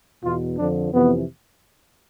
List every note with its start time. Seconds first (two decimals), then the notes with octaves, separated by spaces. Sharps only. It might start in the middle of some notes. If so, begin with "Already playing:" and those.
0.24 E2 B2 F4
0.58 F2 D3 F3 D4
0.91 F2 C3 E3 B3